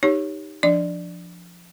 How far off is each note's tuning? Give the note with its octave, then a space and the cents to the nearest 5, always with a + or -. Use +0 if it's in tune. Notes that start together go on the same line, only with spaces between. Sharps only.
D#4 +0 G4 +0 C#5 +0
F3 +0 D4 +0 D5 +5